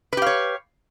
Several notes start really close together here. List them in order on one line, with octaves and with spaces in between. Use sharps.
B4 G4 F5 C#5